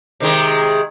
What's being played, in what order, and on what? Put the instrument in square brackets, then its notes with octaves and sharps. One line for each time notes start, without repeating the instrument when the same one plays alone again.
[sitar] C3 D#3 G#3